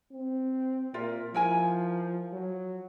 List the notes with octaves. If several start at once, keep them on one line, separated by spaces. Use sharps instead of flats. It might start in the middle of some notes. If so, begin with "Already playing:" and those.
C4
A#2 F4 A#4 E5
F3 E4 A#4 G#5
F#3